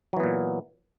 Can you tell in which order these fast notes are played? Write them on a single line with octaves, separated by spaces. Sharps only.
F#3 E3 B3 A#2